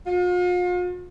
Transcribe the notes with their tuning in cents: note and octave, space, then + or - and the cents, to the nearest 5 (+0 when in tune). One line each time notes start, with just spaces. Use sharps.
F4 +40